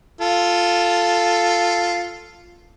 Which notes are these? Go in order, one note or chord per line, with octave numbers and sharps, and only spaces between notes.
F4 A4